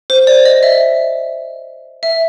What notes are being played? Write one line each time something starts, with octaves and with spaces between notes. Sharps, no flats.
C5
D5
D#5
E5
E5